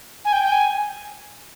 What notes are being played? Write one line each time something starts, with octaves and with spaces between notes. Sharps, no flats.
G#5
G5
G5
G#5